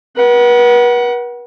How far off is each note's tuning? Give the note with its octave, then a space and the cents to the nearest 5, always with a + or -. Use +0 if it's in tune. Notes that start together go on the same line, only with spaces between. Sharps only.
B4 -40 F#5 +20